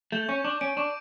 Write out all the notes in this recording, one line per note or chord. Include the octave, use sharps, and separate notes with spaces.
A3 G6
C#4 C#6
D4 C#6
C#4 D7
D4 C#6